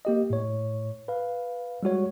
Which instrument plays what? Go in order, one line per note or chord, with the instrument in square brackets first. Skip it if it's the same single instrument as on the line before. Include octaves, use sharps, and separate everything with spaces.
[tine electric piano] A#3 G4 D#5
A2 C#5
B4 F5
G3 G#3 F#4 C#5